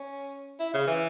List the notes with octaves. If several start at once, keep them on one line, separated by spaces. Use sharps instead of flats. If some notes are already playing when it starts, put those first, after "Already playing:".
Already playing: C#4
E4
C#3
E3